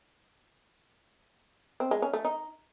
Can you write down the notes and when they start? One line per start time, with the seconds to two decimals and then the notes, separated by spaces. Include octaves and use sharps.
1.80 C4
1.91 G#3
2.02 C#4
2.13 A3
2.25 D#4